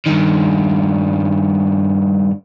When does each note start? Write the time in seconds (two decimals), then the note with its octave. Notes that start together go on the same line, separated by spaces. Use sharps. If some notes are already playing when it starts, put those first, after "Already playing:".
0.06 G2 D#3